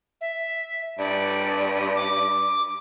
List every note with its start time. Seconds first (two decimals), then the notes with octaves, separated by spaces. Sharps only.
0.21 E5
0.98 G2 D5
1.96 D6